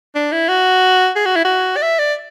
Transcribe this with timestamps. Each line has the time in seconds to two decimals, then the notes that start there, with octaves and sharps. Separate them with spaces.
0.15 D4
0.32 E4
0.49 F#4
1.16 G#4
1.26 F#4
1.36 E4
1.45 F#4
1.77 D5
1.82 E5
1.99 D5